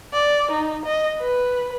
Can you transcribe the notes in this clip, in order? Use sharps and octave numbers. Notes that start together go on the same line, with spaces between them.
D5
D#4
D#5
B4